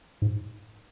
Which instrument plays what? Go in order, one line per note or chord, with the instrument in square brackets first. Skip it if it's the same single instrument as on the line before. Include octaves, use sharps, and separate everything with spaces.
[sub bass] G#2